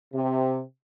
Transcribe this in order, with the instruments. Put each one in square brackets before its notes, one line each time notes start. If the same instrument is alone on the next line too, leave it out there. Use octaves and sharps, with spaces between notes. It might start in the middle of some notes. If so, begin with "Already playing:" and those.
[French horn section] C3